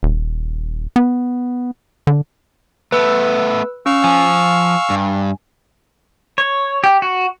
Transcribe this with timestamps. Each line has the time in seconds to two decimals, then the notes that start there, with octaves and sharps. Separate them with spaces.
0.03 D#1
0.96 B3
2.07 D3
2.92 A3 B3 B4 E6
3.86 C#4 F5 C#6 E6
4.04 F3 G#5
4.90 G2
6.38 C#5
6.84 G4
7.02 F#4